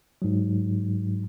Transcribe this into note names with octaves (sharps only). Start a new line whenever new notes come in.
G#2 F#3